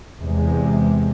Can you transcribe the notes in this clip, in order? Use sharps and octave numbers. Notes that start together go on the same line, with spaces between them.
E2 C3 G#3